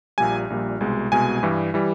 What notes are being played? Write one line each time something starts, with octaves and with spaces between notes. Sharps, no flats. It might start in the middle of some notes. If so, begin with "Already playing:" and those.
A#1 A#2 G3 G#5
A#1 A#2 G3
C2 B2 G#3
C2 B2 G#3 G#5
G2 E3 G3
E3 G3